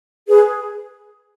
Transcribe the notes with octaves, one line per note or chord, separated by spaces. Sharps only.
G#4 B4